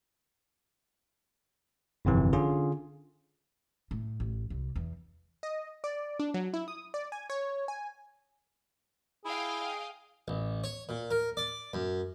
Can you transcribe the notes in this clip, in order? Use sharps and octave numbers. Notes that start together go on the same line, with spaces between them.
G1 F2 C3 E3
D3 C#4 F4 G#4
A2
A1
C2
E2
D#5
D5
D4
F#3
E4
D#6
D5
G#5
C#5
G#5
E4 G#4 D#5 F5 G5
A1
C#5
A#2
A#4
D5
F#2